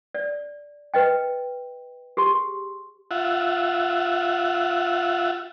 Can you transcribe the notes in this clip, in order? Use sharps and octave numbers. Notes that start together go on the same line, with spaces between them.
D5
B4 D#5 G5
G4 G#4 C6
F4 E5 F#5